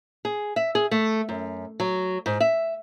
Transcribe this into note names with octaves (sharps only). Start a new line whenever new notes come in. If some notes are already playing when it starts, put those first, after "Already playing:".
G#4
E5
G#4
A3
F#2
F#3
G#2
E5